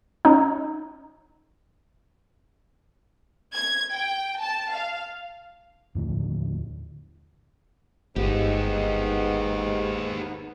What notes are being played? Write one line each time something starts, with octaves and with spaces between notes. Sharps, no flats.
C#4 D#4
G#6
G5
A5
F5
D#2 A2 D3 F3
G1 G#2 B3 D#4 G4